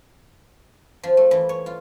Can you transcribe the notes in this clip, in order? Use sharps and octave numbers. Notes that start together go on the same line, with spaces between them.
F3
A3
E3
C#5
F4